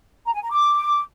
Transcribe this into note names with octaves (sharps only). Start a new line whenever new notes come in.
A#5
G#5
A#5
D6